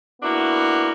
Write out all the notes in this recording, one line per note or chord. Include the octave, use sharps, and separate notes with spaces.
A#3 B3 D4 E4 F#4